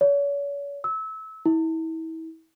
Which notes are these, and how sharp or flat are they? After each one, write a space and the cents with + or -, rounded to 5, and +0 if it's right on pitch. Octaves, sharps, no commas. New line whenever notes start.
C#5 +40
E6 -25
E4 -35